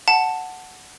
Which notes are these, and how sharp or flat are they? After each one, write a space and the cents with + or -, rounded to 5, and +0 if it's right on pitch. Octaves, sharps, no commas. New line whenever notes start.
F#5 +0 A5 +0